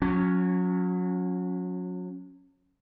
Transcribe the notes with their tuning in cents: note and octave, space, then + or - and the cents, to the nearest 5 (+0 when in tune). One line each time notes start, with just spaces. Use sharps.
F#3 -30 C#4 +0